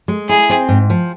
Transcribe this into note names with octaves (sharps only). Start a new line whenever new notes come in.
G#3
E4 G#4
C4
G#2
F3